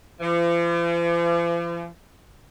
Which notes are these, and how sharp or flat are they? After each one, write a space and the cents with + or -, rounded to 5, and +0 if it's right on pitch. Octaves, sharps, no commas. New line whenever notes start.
F3 -45